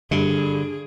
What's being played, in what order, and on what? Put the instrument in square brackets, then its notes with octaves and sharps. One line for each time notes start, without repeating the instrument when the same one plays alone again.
[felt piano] G2 [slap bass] D3 [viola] G#4